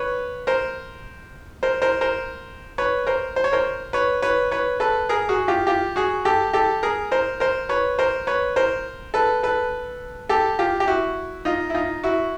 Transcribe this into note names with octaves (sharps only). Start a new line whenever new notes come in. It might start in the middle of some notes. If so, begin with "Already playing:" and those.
Already playing: B4 C#5
A#4 C5
A#4 C5
A#4 C5
A#4 C5
B4 C#5
A#4 C5
C5
C#5
A#4 C5
B4 C#5
B4 C#5
B4 C#5
A4 B4
G#4 A#4
F#4 G#4
F4 G4
F4 G4
F#4 G#4
G4 A4
G4 A4
G#4 A#4
A#4 C5
A#4 C5
B4 C#5
A#4 C5
B4 C#5
A#4 C5
A4 B4
A4 B4
G4 A4
F4 G4
G4
E4 F#4
D#4 F4
E4
D#4 F4
E4 F#4